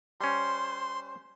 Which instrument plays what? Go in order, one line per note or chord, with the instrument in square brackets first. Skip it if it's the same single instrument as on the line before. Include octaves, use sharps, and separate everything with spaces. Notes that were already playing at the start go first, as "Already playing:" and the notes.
[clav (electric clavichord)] G3 C#4 [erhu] C5 [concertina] C6